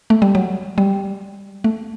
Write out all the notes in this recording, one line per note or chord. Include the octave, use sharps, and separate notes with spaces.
A3
G3
F#3
G3
A3